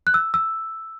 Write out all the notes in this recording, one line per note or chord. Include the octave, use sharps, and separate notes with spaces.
F#6
E6
E6